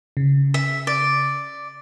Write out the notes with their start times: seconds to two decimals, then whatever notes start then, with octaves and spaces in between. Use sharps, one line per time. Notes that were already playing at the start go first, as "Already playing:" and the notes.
0.17 C#3
0.54 E5
0.87 D5